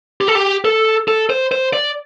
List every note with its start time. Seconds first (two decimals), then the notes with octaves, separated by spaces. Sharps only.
0.21 G4
0.28 A4
0.35 G4
0.65 A4
1.08 A4
1.30 C5
1.52 C5
1.73 D5